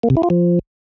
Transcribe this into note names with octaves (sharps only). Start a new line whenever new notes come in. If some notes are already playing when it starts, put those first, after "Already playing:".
A#3
C3
E4
F4
F3